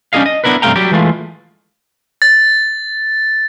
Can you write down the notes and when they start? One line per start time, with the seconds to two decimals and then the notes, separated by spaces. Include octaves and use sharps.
0.13 G3 C#4 D4 G#4 D#5 F5
0.26 D#5
0.44 B3 D4 E4 A#4 B4
0.62 G2 C3 A3 F5 G5 A#5
0.76 F#3 G3 G4
0.91 E3 G#3 A3 F4
2.22 A6